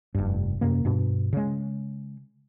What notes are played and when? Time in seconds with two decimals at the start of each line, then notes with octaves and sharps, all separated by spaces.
0.15 F1 G2
0.61 F#2 C3 A#3
0.85 G2 B2
1.33 C#3 G#3